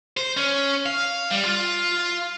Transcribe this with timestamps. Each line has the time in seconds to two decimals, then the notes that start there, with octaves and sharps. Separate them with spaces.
0.17 C5
0.37 C#4
0.86 F5
1.31 G3
1.45 F4